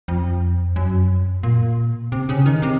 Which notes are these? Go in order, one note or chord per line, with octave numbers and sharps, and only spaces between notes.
F2
F#2
A#2
C3
C#3
D#3
C3